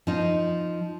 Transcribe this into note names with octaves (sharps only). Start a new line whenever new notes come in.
F3 D#4